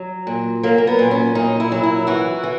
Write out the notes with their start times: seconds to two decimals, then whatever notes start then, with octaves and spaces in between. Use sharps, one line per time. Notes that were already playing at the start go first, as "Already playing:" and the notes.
Already playing: F#3
0.27 A#2
0.63 F#3 A#3
0.78 A#3
0.87 B3
0.99 A#2
1.11 C#4
1.35 A#2 D#4
1.60 E4
1.72 F#3
1.83 E4
2.07 E3 F#4
2.43 E3